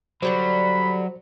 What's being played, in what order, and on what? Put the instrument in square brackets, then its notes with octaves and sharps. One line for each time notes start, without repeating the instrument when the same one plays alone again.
[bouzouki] D3 G3 D5 [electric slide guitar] F#3 [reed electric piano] C5 [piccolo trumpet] B5